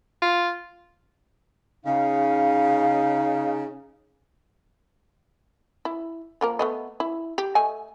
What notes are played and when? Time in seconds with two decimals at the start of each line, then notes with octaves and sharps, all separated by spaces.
0.22 F4
1.85 C#3 D#4 F5
5.85 E4
6.41 F3 A#3 A#4
6.59 A3 B3 D#5
7.00 E4
7.38 G4
7.55 A3 D#5 G#5